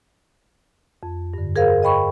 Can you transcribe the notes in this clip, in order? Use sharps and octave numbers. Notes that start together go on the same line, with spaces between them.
F2
G2 D3
G#4 A#4 C5 F5
D#5 G5 B5 C#6